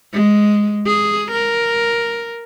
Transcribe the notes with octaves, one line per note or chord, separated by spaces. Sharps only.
G#3
G#4
A#4